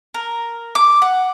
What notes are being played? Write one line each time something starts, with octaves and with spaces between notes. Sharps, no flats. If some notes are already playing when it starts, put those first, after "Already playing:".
A#4
D6
F#5